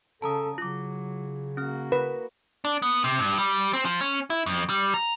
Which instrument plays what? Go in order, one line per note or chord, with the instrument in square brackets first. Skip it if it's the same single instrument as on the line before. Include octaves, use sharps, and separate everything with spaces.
[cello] C#3 [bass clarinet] A4 [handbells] A5 A#5 D#6
[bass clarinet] C#3 [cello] F#3 [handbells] F4 D6
[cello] A#3 F#4 [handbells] C#4 F6
[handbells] A#4 [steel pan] B4
[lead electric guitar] D4
B3
C3
G2
G3
C4
F3
C#4
E4
F2
G3
A#5